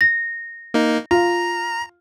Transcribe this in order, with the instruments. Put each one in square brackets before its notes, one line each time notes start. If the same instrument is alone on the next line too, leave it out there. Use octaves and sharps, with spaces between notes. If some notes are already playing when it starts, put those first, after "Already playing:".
[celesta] A#6
[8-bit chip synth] A#3 D#4
[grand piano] F4 [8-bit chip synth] A#5